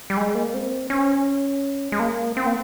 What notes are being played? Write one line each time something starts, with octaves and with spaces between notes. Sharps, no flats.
G3
G#3
A#3
C4
C#4
G#3
A#3
C4
A#3